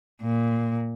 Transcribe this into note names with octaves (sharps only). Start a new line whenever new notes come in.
A#2